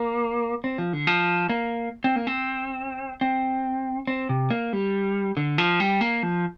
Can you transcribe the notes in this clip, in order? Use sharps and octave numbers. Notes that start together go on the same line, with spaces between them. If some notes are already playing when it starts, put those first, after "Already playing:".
Already playing: A#3
C4
F3
D3
F3
A#3
C4
A#3
C4
C4
C4
C3
A#3
G3
D3
F3
G3
A#3
F3